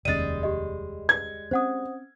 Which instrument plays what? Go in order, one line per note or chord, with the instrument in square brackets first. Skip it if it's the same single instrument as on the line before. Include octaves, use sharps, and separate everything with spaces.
[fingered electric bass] F1 D#2 C#4 [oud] G3 G#3 [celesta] A6 D#7
[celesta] G4 D#5
[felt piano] G#6
[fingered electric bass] C4 C#4 [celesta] C5 F#5 D#6